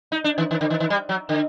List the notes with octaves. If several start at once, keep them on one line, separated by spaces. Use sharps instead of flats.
D#4
D4
D#3
D#3
D3
D#3
D#3
G3
F#3
D3